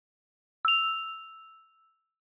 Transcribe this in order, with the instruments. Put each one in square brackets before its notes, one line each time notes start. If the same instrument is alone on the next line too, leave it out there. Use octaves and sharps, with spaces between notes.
[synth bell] E6 F7